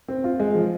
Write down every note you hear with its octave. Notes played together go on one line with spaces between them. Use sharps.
C4
F4
G#3
F3